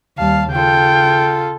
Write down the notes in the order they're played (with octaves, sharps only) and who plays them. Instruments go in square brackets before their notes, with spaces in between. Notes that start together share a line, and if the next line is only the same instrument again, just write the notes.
[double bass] D#2 G3 [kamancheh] F5 A5
[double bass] C#3 [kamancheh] F4 A4 [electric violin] G5